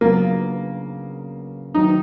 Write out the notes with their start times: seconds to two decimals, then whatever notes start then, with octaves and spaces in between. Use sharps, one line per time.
0.01 C#3 F#3 A#3 B3 D4 F4
1.74 D#3 F#3 A3 D#4